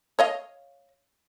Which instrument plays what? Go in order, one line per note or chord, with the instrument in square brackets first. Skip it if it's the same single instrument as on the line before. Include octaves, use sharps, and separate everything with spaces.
[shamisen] C#5 D#5 F5